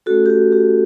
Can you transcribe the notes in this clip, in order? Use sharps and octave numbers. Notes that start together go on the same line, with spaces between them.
A3 C#4 F#4 A4
G4
F#4
G4